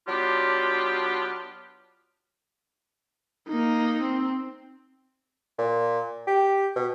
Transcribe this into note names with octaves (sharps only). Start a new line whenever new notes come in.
F#3 B3 D4 F4 G4
A#3 D#4
C4
A#2
G4
B2